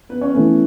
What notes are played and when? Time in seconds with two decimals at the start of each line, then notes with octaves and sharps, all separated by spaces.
0.09 B3 B4
0.21 C#4 C#5
0.33 E3 A3 B3 C#4 B4